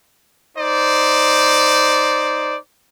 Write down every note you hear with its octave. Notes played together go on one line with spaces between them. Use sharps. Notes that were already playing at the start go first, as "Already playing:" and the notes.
D#4 C5 D5